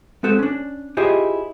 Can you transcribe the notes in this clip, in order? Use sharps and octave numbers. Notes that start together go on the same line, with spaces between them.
G#3 C4 F#4 A4 C5
C#4 D4
E4 F4 G4 G#4 C5 D#5